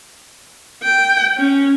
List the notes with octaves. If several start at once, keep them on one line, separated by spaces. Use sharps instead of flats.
G5
C#4